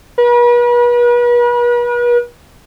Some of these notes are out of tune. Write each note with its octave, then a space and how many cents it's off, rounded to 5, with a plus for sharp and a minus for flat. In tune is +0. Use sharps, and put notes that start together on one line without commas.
B4 -40